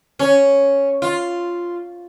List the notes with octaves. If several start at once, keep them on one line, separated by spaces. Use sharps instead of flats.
C#4
F4